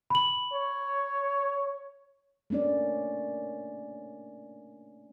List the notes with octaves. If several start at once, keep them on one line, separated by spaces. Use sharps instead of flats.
B5 F#7
C#5
A3 A#3 C#4 D4 D5